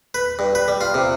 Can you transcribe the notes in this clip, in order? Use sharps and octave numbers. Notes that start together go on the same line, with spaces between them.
B4
G2
B4
G3
F4
C3